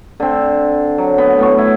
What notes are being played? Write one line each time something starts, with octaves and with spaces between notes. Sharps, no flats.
D3 C4
F#3
B3
A2 B3 C#6
E4